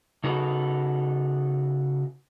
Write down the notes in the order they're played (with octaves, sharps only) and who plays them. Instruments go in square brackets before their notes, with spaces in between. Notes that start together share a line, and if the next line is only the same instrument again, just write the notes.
[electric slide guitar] C#3 D#4 F#4 A4 B4